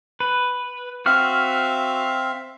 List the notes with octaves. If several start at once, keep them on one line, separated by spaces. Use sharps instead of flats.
B4
C4 F#4 E5 F5 F6